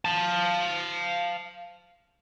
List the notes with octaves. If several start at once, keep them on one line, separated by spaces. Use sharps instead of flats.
F5 A5